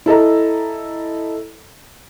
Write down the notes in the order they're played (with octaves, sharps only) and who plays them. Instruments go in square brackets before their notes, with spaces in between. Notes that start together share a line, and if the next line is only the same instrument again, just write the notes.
[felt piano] E4 A4 D#5 A#5